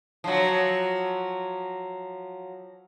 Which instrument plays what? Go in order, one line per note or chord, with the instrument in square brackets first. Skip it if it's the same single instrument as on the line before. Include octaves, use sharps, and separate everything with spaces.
[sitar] F3 F#3